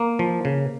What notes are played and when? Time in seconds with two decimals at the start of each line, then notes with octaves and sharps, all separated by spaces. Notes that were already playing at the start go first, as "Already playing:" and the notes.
Already playing: A#3
0.19 F3
0.45 C#3